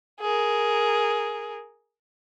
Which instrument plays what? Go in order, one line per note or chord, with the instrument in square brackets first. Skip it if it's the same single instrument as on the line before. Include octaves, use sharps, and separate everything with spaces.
[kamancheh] G#4 A#4